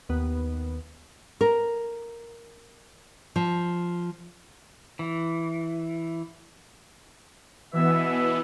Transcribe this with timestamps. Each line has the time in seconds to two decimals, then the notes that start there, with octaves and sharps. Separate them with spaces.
0.09 D#2 B3
1.41 A#4
3.36 F3
4.99 E3
7.73 B2 E3 B3 E5